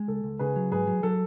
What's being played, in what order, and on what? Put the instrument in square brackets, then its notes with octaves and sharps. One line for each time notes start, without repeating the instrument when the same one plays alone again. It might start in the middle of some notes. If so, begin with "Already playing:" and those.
Already playing: [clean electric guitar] G#3
[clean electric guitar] C#2 [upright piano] A4
[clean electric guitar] C#2
[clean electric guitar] C#3 [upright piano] G#4 B4
[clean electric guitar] F#3
[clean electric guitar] G#2 [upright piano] G#4 B4
[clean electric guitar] F#3
[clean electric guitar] F#3 [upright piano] A4